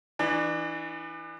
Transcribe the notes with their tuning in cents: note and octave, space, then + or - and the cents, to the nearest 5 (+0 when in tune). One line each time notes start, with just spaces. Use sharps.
E3 -5 D4 +40